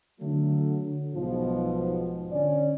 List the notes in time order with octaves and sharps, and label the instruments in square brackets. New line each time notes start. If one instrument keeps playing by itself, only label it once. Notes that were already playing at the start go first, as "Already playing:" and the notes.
[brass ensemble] D3 F#3 A3
B1 G#2 B2 F3
D3 C#4 D5